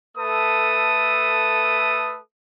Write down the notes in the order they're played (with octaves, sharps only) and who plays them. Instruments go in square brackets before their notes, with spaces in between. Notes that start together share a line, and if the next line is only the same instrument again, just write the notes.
[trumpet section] A3 A4 B4 D#6